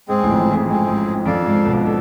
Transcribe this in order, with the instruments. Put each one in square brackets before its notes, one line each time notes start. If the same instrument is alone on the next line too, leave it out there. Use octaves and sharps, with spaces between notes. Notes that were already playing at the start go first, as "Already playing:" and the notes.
[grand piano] G#2 [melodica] G#3 C4 G#4
[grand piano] A1 A2
F2
G#2
F2
[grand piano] G#2 [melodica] G#3 C4 G#4
[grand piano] G#2
[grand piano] F2 [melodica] D4 A4 D5 F5
[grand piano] G#2
B1 B2
[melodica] D4 A4